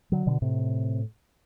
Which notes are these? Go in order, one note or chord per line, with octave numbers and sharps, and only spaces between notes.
D3 F#3
B2 D3
A2 C3